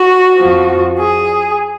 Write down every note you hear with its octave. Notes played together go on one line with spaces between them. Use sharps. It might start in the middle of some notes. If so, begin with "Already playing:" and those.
Already playing: F#4
F2 F3
G#4